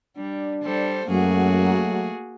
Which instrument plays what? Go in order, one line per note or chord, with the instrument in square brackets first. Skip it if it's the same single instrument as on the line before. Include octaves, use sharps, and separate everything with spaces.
[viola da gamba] G3 [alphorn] D4
[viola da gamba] G3 A4 C5
[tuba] F#2 [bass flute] F#3 [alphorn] A3 [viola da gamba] A#3 F#4 G#4